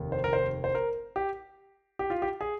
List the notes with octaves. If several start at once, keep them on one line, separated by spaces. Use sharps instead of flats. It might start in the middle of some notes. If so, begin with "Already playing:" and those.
Already playing: F1 D#2 D#3
C5
A#4
C5
C5
A#4
G4
G4
F4
G4
G#4